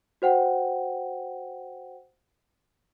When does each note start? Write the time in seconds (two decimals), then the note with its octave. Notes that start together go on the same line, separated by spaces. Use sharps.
0.22 F#4 C5 F#5 G5